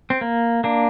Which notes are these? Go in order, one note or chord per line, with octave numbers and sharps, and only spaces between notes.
C4
A#3
A#3 D4